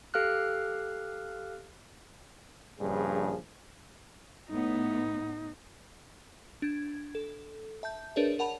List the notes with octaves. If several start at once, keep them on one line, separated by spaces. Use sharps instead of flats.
G4 A4 F5 F6 F#6
A#1 G2 C#3 F3 G#4
A2 B3 D#4
D4 G#6
A4
E5 A5 G6
D4 G#4 A#4 B4 C#5 D5
A#4 F#5 A5 B5 F7